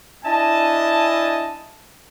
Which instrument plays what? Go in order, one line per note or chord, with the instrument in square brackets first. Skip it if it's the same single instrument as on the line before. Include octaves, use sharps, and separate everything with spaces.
[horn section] D4 E4 D#5 G#5 A5